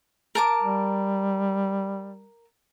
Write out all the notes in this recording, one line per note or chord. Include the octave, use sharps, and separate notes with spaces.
A#4 A5 D6
G3